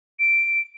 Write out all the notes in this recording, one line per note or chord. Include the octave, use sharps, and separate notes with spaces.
D7